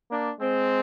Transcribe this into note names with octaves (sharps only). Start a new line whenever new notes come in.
A#3 D4
G#3 C4